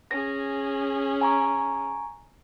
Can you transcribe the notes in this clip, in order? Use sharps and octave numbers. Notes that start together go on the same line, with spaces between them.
C#4 G#4 A#6
G#5 A#5 C#6